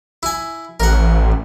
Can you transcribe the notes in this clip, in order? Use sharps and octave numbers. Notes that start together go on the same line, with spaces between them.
E4 G#5
A1 A#4 F#5